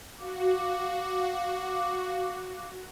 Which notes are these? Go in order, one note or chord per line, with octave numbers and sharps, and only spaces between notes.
F#4 F5 D6